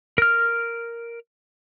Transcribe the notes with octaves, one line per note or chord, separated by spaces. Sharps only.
A#4 F6